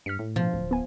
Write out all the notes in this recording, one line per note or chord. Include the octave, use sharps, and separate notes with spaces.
G2 F6 B6 C#7
A2
B2 F3
D1
B3 G#5